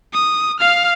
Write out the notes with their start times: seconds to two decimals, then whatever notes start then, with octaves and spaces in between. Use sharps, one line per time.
0.14 D#6
0.60 F5 F6